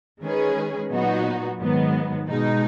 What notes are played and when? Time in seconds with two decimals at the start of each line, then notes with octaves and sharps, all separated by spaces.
0.21 D#3 G#3 C#4 G#4 B4
0.90 A#2 F#3 B3 D#4 F#4
1.59 G#2 D#3 F#3 B3
2.28 B2 G#3 D#4